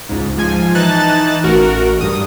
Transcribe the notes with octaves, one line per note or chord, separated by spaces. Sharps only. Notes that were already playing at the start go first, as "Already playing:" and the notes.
C#2 G#2
G#2 F3 G#5
E3 D#4 A5 F#6 A6
A1 F#4 A#4
G2 D#6